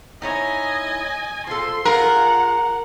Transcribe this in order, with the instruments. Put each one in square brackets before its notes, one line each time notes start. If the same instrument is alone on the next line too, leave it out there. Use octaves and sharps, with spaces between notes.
[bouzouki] D#4 E4 C#5 [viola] D#5 G#5
[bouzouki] F3 A4 [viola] C6
[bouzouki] F4 G#4 [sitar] A#4 [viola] F#5